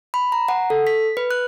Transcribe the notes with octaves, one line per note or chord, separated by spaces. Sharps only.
B5
A#5
F#5
A4
B6
B4
F#6